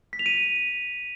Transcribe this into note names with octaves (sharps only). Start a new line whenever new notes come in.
B6
F7
D#7